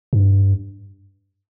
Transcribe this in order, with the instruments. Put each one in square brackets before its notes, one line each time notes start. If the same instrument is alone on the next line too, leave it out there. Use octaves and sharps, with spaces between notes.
[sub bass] G2